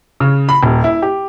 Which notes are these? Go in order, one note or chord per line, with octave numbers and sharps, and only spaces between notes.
C#3
B5
D#1
E4
G4